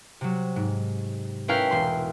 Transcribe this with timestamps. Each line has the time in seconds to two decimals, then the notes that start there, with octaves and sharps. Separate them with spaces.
0.21 C3 F#3
0.56 G#2
1.48 C#4 E4 A#4 B4 F5 G5
1.70 E1 C6